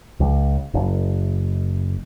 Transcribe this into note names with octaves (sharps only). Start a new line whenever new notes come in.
C#2
F#1